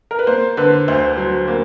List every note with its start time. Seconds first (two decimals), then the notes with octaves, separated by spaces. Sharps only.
0.11 A#4
0.19 B4
0.27 A#3 C5
0.57 D3 B4
0.88 D2 C5
1.18 F#3
1.48 A#3